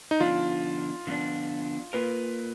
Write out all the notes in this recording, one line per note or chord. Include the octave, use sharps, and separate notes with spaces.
D#4
D3 F3 B3 D4 F4
D3 F3 B3 D4
A#3 F4 A#4 B4